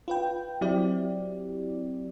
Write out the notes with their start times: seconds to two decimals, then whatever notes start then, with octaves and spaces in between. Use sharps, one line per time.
0.08 F4 B4 G5
0.61 F#3 C4 E4 G4 D5